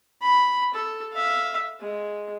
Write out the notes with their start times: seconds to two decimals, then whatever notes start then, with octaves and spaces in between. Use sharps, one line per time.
0.22 B5
0.74 A4
1.14 E5 F5
1.81 G#3